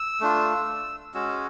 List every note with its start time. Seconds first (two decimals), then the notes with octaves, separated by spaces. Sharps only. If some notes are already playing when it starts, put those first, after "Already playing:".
Already playing: E6
0.21 A3 D4 F4
1.15 G#3 C#4 F#4 E6